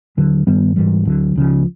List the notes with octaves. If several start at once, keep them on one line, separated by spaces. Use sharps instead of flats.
D#2 D3 F#3
G2 D#3 G3 B3
G#2 E3 G3
D2 D3 F#3
C#2 C#3 F3